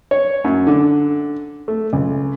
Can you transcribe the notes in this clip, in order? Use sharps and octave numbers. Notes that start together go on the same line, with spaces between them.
C#5
F#2
D3
A3
C#2